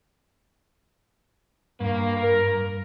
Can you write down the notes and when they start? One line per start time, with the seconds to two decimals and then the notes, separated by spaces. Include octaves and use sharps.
1.80 G2 A#3
2.16 A#4